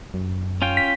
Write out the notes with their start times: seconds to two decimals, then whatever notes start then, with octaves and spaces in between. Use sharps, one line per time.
0.14 F#2
0.62 C#4 F4 G5
0.77 B6